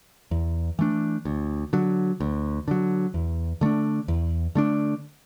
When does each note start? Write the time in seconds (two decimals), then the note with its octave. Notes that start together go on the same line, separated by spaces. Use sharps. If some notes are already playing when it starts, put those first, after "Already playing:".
0.31 E2
0.79 E3 A3 D4
1.25 D2
1.73 D3 F#3
2.20 D2
2.68 D3 F#3
3.14 E2
3.61 D3 A3 D4
4.08 E2
4.55 D3 A3 D4